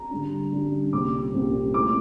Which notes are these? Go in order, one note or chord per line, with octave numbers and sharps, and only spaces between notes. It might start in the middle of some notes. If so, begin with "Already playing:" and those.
Already playing: A#5
D3 G3 D4
D3 G3 D4
C2 A#2 G3 C4 D6
C2 A#2 G3 C4
A#2 A3 C4 E4 D6